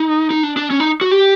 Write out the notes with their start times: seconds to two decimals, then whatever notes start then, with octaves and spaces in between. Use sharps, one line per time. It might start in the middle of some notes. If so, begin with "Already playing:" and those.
Already playing: D#4
0.31 D#4
0.43 D4
0.57 D4
0.71 C#4
0.80 D#4
1.01 F#4
1.11 G4